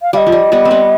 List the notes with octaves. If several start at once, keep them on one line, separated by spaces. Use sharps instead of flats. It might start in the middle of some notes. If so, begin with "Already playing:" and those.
F5
G3 D#5 F5
F3
G3
G3 B3
C4
G3 B3